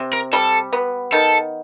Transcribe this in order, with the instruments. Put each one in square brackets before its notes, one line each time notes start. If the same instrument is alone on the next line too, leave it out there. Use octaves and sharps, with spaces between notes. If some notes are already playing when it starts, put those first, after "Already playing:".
Already playing: [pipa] C3
[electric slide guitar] A#4
[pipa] G3 [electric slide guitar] A4
[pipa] B3
[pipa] D#3 [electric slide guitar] A4